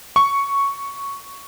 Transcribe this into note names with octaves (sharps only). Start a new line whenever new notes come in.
C#6